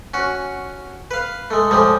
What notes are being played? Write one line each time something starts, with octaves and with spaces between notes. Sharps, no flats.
C#4 F#4
B4 F5
G#3 A3
A2 F3 G3 G#3